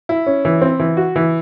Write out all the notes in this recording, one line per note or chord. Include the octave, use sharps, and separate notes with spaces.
E4
C#4
E3
C4
E3
F#4
E3